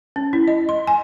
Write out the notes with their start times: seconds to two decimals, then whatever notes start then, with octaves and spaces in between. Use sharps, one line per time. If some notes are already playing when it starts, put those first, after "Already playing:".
0.16 C#4
0.33 E4
0.48 D#5
0.69 C6
0.87 G#5